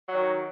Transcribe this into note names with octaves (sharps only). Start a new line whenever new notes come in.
D#3 F#3 F#4